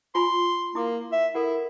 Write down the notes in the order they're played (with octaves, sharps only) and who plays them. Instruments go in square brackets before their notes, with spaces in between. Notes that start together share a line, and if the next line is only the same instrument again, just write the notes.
[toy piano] F4 G#5 B5 [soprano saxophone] C6
[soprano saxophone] A#3 [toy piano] E4 C6 D6
[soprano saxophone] E5
[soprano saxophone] E4 [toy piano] A4 A#4 F#5